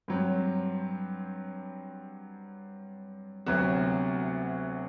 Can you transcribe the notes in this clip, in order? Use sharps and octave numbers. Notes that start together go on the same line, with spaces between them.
G2 F#3 C4
D2 C3 F#3 B3 F#4